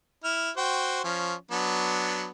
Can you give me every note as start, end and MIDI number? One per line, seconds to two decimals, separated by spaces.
0.24 0.50 64
0.24 0.50 89
0.57 0.99 66
0.57 0.99 72
0.57 0.99 79
1.04 1.34 53
1.04 1.34 61
1.51 2.30 54
1.51 2.30 59
1.51 2.30 62